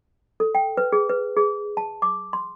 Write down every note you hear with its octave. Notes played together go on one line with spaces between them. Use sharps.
A4
G5
B4
G#4
B4
G#4
A5
D6
C6